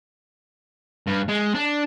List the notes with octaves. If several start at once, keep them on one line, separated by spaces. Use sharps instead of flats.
G2
G#3
D4